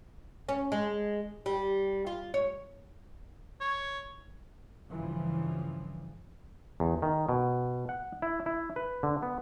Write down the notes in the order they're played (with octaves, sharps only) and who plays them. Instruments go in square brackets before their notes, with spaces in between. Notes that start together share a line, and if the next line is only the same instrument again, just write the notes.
[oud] C#4
G#3
G3
F4
C#5
[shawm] C#5
[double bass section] G2 C#3 E3 F3
[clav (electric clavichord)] E2
D#3
B2
F#5
E4
E4
B4
D3
B3